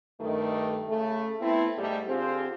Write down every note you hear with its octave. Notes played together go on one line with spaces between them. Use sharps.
G2 D#3 A3
C#3 A3
A3 B3 C4 E4
G#2 G3 A3 G4 D5
D3 C4 F4 G4 G#4 C5